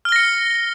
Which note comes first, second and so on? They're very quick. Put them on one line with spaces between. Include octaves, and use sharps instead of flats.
F6 G7 A#6 C#7